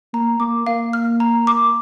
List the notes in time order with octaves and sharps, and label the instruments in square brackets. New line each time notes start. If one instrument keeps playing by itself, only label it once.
[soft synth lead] A#3 [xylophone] A#5
[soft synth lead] A#3 [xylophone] D6
[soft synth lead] A#3 [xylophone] F5
[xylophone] F6
A#5
D6